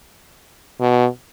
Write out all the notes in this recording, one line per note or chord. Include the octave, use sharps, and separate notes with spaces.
B2